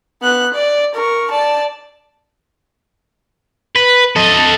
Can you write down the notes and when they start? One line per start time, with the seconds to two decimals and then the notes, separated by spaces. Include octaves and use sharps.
0.22 B3 F#6
0.54 D5
0.95 A#4 C#6
1.31 D5 A5
3.76 B4
4.16 A4 D#5